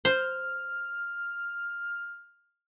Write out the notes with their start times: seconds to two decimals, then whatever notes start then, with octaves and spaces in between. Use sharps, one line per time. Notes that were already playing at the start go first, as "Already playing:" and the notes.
0.05 C5 F6